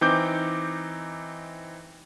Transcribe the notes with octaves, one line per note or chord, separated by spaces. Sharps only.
E3 C4 D#4 D6 G6